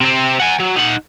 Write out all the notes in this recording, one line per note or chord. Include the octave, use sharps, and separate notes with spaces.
C3 C4
F#5 G#5
F#3
D#4 F#5